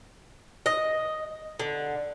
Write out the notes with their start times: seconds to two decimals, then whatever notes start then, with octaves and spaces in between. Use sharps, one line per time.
0.66 D#5
1.60 D3